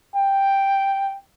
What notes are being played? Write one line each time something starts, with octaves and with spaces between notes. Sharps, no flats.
G5